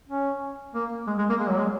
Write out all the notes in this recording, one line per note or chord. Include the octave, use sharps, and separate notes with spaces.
C#4
A#3
G#3
G#3
A#3
G#3
F#3
G#3